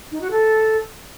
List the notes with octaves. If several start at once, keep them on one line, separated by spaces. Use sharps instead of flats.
D#4
F#4
A4